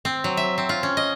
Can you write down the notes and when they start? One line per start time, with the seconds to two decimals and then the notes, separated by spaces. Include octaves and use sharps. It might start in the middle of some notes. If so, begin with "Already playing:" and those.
0.05 C4
0.24 F#3
0.37 E5
0.58 C4
0.69 F4
0.83 C#4
0.97 D#5